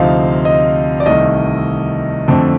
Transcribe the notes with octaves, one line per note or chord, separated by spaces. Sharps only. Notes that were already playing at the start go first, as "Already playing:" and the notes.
Already playing: D2 C3 F3 C4 D#4 F5
D#5
D5
C2 C3 D#3 A3 D#5
F2 D3 A3 C4